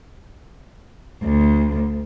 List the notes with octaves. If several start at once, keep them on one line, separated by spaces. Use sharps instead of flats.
D2